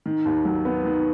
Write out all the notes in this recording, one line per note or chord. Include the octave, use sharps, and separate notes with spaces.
D#3
D#2
F#3
B3
D#3